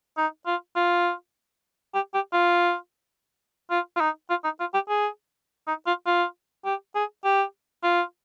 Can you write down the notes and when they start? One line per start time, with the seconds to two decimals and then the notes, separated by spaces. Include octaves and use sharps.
0.17 D#4
0.46 F4
0.76 F4
1.94 G4
2.14 G4
2.33 F4
3.70 F4
3.96 F4
4.00 D#4
4.30 F4
4.44 D#4
4.60 F4
4.74 G4
4.89 G#4
5.67 D#4
5.87 F4
6.06 F4
6.65 G4
6.95 G#4
7.24 G4
7.83 F4